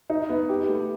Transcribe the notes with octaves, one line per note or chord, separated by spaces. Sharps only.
D#4
B3
G4
A3